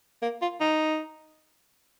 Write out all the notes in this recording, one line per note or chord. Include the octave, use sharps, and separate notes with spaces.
A#3
F4
D#4